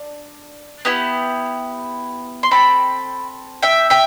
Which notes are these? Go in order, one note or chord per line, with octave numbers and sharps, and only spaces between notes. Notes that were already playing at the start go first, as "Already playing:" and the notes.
Already playing: D4
B3 E4 G4
C6
C4 F#4 A4 G5 B5
E5 G5
E5 G5